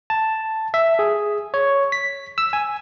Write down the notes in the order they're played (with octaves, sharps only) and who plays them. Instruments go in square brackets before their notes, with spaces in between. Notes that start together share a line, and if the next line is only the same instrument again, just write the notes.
[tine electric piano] A5
E5
G#4
C#5
B6
E6
G#5